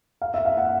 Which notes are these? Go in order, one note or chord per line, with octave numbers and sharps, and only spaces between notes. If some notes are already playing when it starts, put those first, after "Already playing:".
F5
E5
F5
F#5